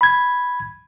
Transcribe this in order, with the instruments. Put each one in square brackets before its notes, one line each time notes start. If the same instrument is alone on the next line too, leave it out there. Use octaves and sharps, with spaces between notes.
[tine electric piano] B5 G#6